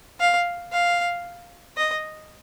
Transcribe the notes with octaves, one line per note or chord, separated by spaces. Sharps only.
F5
F5
D#5